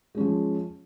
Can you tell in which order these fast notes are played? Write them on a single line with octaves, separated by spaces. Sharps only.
G#3 C#4 F3